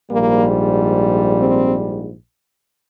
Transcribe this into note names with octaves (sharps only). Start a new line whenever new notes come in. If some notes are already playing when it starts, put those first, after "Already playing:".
A#1 G#2 G3 A#3
C4